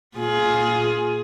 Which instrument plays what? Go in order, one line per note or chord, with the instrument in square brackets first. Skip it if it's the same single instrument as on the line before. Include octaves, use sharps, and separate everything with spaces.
[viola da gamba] A#2 F4 G#4